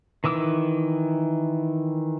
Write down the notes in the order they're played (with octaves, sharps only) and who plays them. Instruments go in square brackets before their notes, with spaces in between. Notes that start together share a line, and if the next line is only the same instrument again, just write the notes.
[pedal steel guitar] D#3 E3 D6 E6